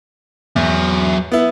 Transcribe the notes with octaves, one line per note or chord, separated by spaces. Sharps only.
E2 F#3 E5
B3 E4